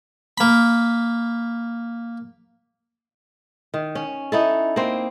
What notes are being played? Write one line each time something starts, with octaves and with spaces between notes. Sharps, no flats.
A#3 B5
D#3
C#4
D#4 E4 A4
A#3 C4